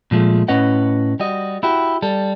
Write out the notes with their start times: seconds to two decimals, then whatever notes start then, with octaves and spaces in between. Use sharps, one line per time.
0.11 A#2 F3 G#3 A3
0.48 A2 C#4 B4 D#5 F#5
1.20 G3 F#4 D#5
1.63 E4 F#4 G4
2.02 G3 A4